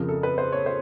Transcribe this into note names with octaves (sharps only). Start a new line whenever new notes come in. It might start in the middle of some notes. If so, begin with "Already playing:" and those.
Already playing: F2 C#3 F3 A#4
A4
B4
C5
C#5
C5